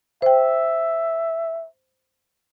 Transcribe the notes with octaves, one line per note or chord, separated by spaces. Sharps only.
C5 E5 G5